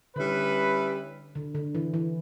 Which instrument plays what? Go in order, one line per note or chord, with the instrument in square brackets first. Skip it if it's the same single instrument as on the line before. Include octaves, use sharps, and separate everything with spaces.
[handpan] D3 [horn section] G3 C#4 E4 B4
[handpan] D3
D3
E3
E3